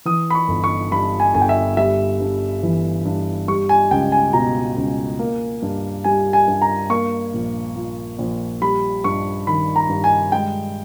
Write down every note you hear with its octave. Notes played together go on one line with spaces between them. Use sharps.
E3 D#6
B5
C#6
G1
C#6
G2 B5
G#5
G1 G#5
G5
E5
G3 E5
G2
E3
G2
G3 C#6
G#5
C#2 G5
G#5
B2 A#5
C#2
A#3
G2
G3 G#5
G#5
G2
A#5
A#3 C#6
A#1
A#2
A#1
G3 B5
G2 C#6
D#3 B5
A#5
G2
G#5
G#3 G5